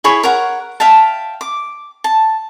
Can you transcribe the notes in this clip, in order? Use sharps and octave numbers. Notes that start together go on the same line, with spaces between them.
E4 G#4 C#5 B5
A#4 C#5 F#5
E5 F5 G5 A5
D6
A5